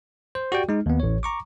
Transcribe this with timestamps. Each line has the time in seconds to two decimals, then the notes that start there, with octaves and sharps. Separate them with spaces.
0.35 C5
0.52 F#4 G4 D5 G5
0.69 G#3 D#4
0.86 D#2 B3
1.00 A1 C#5
1.23 A#5 C#6 D6